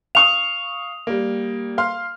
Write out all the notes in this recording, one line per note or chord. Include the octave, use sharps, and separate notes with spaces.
F5 C#6 D#6 F7
G3 A#3
F5 C6 F6